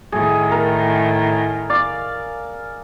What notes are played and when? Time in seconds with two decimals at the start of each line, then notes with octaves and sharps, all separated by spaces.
0.12 A2 D#3 G#4
0.51 A#4
1.70 D5 F5